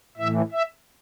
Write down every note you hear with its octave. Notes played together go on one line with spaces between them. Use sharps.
A2 E3 E5
E5